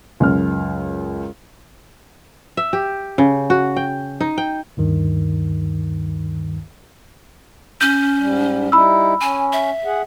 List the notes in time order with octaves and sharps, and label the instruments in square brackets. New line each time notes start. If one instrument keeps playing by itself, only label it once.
[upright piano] C#2 F#2 F6
[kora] E5
G4
C#3
F#4
G5
D#4
G5
[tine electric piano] D2 G2 D#3
[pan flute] C#4 [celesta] G6
[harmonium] G#2 G3
[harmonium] G3 D#4 E4 [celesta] B5 E6
[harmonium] C#4 [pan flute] G#5
[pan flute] E5
[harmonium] G#4 F#5